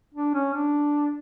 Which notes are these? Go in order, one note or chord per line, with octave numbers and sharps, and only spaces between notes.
D4
C#4
D4